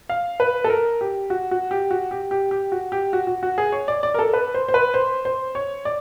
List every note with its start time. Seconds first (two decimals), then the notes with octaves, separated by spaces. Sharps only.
0.10 F5
0.40 B4
0.64 A4
0.70 A#4
1.01 G4
1.30 F#4
1.51 F#4
1.71 G4
1.91 F#4
2.11 G4
2.31 G4
2.51 G4
2.72 F#4
2.92 G4
3.13 F#4
3.27 F#4
3.43 F#4
3.58 G#4
3.72 C#5
3.88 D5
4.03 D5
4.14 A#4
4.19 A4
4.33 B4
4.54 C5
4.68 C5
4.74 B4
4.94 C5
5.25 C5
5.55 C#5
5.85 D5